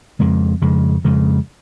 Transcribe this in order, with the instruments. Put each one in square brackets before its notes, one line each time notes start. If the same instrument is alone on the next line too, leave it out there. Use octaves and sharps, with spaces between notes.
[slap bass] F2 C#3 G#3
F2 C#3 G#3
F2 C#3 G#3